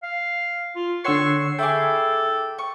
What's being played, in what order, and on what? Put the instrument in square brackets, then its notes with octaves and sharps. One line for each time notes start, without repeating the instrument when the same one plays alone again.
[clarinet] F5
F4
[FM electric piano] D3 E6 C7 [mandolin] C#5 F#5 C6 [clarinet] C#6
[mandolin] E4 G#4 [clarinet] A4 [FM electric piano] G5 D6
[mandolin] C#6